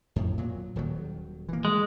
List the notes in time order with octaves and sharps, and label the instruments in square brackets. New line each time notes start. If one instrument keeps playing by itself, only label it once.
[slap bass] F2 A2
A#2 F#3
D#1 D#3 F#3
E3 A#3
[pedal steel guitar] G#3